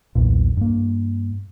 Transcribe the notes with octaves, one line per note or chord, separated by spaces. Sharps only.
B1 E2 A#2
G2 A#3